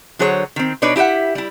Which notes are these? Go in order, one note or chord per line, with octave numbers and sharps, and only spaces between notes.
D3 F#3 G#4 C5 C#5
D#3 C4
B2 D4 D#4 B4 C#5 D5
E4 G4 D#5 E5 F#5
G3 E4